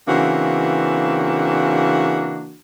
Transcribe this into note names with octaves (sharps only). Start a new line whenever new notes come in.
C#3 E3 A#3 C4 D4 F#4